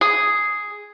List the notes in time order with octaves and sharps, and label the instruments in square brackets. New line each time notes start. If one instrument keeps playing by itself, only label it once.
[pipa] G#4